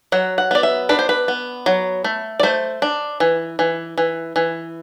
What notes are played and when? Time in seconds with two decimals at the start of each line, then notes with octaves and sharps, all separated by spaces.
0.12 F#3 F#5
0.38 F#5
0.51 B3 D5
0.63 E5
0.89 D4 B4
0.99 C5
1.09 B4
1.28 B3
1.66 F#3
2.04 A3
2.40 D5
2.43 A3 C5
2.82 D4
3.20 E3
3.59 E3
3.98 E3
4.36 E3